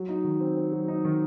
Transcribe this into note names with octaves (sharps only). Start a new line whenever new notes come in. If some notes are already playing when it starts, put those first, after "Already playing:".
Already playing: F#3
D#4
D#3
C4
C4
F#3
D#4
D#3